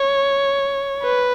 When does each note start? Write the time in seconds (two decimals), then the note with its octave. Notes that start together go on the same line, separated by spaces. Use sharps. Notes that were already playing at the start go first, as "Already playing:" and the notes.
Already playing: C#5
1.03 B4